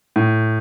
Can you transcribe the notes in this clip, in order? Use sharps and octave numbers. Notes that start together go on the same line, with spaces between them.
A2